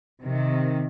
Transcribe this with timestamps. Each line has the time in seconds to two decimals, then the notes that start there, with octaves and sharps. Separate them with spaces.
0.23 C3 D#3